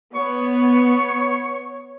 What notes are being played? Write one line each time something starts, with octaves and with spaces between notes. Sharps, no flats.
B3 C#5 C#6